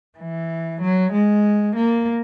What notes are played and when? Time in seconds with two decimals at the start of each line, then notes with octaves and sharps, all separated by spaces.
0.18 E3
0.81 F#3
1.12 G#3
1.76 A#3